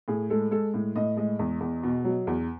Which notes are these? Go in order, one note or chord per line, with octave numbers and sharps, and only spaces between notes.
A2 G#4
G#3 A4
G#3 A4
A2
A2 D#5
G#3 D#5
E2
E2
B2
F#3
E2